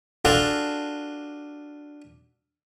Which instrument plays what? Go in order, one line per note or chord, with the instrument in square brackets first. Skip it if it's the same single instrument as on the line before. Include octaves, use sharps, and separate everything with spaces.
[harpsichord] D4 F4 F#4 G#4 A4